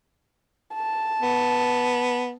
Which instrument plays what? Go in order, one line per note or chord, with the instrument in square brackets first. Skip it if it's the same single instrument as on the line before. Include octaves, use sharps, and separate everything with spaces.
[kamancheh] A5
[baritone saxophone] B3